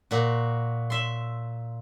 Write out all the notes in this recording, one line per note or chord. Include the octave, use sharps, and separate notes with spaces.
A#2 F#4
E5 C6